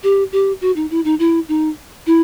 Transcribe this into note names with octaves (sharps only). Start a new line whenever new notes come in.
G4
G4
F#4
D#4
E4
D#4
E4
D#4
E4